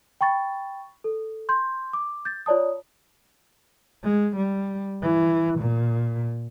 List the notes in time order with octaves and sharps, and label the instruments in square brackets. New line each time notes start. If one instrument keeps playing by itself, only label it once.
[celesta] G5 B5 C#6 A6
A4
C6 G6
D6
G6 A6
F4 C#5 D5 A5 D#6
[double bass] G#3
G3
E3
A#2